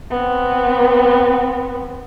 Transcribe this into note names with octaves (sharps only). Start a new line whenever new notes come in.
B3 C4